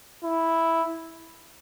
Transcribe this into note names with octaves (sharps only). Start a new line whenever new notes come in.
E4